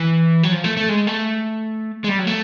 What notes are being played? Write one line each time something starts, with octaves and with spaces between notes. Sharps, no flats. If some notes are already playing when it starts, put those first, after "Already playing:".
Already playing: E3
F#3
F3
A3
A3
G#3
A3
G#3
G3
F#3
A3